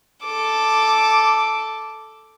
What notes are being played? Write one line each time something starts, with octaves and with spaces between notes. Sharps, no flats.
A4 D6